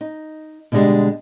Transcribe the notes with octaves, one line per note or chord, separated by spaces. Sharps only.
D#4
B2 D3 G3 G#3 D4